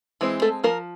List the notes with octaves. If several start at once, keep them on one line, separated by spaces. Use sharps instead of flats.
E3 G#3 C4
A3 A4
F3 A#3 A#4